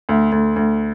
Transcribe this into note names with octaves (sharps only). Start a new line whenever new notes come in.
D2
D2
D2